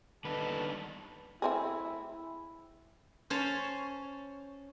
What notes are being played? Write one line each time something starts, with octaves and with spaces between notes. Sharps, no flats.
D#2 D3 G3 B3 D#4 B4 A5
A3 C4 E4 G#4
C#4 C5 C#5 A5